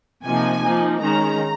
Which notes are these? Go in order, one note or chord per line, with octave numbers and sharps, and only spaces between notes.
C3 F3 A#3 D#4 G#5
F3 A#3 D#4
D#3 G#3 C#4 A#5